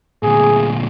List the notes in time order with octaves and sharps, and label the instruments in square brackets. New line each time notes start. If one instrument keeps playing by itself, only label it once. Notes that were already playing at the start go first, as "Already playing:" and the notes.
[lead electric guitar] D2 A#2 [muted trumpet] G#4